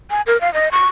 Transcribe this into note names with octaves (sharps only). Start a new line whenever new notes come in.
G#5
A#4
F5
D#5
C#6